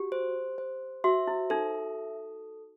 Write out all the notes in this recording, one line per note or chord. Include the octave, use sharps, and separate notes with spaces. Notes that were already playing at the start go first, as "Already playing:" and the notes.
Already playing: F#4 G4
C5
C5
F#4 E5
E4
D#4 A4